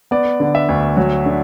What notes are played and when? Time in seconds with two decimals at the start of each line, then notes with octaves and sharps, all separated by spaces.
0.11 B3 D5
0.40 D3
0.55 E5
0.69 D2
0.97 F#3
1.26 D3